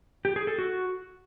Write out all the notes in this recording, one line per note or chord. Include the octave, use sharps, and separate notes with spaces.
G4
G#4
A4
F#4